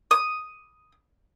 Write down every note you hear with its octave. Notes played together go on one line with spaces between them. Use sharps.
D#6